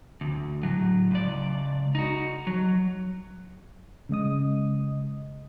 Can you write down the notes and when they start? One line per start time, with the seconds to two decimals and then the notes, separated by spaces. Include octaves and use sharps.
0.21 D2
0.63 A2 F#3
1.11 C#2 D5
1.95 D#4 F#4
2.47 F#3
4.09 C#3 G#3 D#5 D#6